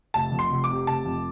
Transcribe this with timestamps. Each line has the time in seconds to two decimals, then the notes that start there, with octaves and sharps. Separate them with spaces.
0.14 F1 A5
0.32 F2
0.39 C6
0.52 F1
0.64 D6
0.70 C3
0.87 F1 A5
1.06 F2